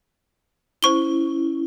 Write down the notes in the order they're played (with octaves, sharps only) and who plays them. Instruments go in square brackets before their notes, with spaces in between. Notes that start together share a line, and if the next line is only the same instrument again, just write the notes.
[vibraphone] C#4 E4 [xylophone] C5 C#6 G7